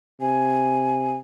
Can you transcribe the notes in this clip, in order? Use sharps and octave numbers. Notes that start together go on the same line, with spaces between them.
C3 G#5